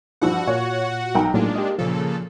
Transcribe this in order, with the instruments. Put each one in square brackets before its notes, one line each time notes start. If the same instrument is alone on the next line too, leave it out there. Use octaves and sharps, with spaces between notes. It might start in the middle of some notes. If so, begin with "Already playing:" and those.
[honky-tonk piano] G2 F3 E6 [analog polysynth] F#4 F#5
[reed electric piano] A#2 F4 [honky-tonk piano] C#5
[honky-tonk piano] B1 G5 A#5
[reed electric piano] A2 F#3 [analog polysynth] G#3 D4 F4 [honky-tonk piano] A#3
[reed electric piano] G4 D#5
[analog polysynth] A#2 C#3 A4 [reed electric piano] F3